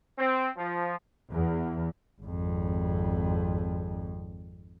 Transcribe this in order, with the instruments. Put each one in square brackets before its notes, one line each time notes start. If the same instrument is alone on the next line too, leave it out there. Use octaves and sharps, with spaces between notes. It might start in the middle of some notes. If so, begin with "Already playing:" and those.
[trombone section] C4
F3
[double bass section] E2
[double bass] G#1 F2